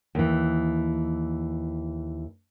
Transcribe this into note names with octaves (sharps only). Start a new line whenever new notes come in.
D#2 E3